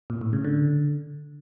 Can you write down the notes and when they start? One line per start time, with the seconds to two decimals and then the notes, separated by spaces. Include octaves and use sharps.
0.10 A#2
0.21 A2
0.33 C#3
0.45 D3